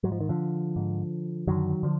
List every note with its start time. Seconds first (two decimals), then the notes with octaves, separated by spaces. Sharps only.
0.03 G#2 F#3
0.12 F3
0.20 D#3
0.29 D3 F3
0.76 G#2
1.47 F#2 D3 D#3 F#3
1.83 D3 F3